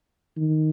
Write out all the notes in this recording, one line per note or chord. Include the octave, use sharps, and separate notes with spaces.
D#3